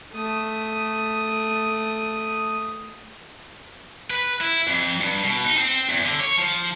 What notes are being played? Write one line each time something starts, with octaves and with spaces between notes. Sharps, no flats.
A3 D#6
B4
E4
F2
G2
B2
D#4
C4
E2
D3
C#5
F3